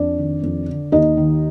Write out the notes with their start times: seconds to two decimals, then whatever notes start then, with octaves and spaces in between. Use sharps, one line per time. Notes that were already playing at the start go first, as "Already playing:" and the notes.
Already playing: F2 D4 D5
0.18 D#3
0.43 F2
0.68 D3
0.92 D#2 D#4 D#5
1.17 D#3